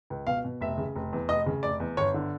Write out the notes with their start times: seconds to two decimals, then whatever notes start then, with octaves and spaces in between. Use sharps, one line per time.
0.10 C#2
0.27 B2 F5
0.45 B2
0.61 F1 E5
0.78 C#3
0.96 F1
1.13 E2
1.29 F1 D#5
1.46 C#3
1.63 F1 D5
1.80 E2
1.97 G1 C#5
2.14 D3